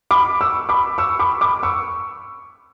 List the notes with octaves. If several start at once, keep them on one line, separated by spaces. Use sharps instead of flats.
B5 D6
C#6 E6
B5 D6
C#6 E6
B5 D6
B5 D6
C#6 E6